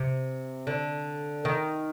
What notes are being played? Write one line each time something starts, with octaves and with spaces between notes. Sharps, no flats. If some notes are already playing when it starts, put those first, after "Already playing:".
Already playing: C3
D3
D#3